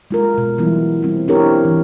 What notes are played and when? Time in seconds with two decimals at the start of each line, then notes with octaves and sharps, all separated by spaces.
0.11 G#3 F4 A#4
0.34 B2 G#3
0.58 E3 F#3 G3 B3 E4
1.03 G3 C4
1.28 C4 D4 E4 G4 A#4 C#5
1.65 E3